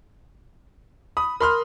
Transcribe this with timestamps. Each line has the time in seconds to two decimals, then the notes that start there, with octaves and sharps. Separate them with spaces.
1.17 B5 D#6
1.40 A#4 B5 C6 F6